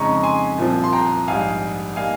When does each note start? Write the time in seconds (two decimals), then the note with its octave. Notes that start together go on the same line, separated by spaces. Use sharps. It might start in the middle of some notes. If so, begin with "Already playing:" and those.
Already playing: F2 C#3 G#3 D#4 A#5 C#6
0.23 G#5 C6
0.58 C2 A#2 F3 C4
0.84 C6
0.93 G5 A#5
1.28 A#1 G#2 G3 F5 G#5
1.96 G3 A#3 D#4 F5 G#5